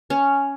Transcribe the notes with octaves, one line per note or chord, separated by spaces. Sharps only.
C#4